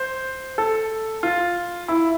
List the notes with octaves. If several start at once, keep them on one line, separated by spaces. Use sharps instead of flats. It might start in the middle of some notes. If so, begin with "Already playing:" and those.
Already playing: C5
A4
F4
E4